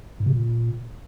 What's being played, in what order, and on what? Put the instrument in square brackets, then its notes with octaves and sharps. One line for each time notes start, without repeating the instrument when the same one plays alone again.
[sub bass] G#2
C3
A#2